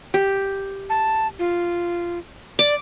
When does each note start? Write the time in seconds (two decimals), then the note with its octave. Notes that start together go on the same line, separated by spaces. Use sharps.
0.14 G4
0.90 A5
1.39 F4
2.59 D5 D6